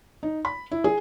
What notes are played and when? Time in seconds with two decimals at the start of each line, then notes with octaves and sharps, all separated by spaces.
0.23 D#4
0.45 B5
0.71 E4
0.84 G#4